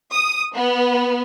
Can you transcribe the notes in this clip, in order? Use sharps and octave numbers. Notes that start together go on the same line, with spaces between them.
D#6
B3